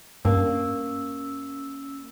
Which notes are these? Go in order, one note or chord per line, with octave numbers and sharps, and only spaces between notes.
G2 A#3 C#4 E6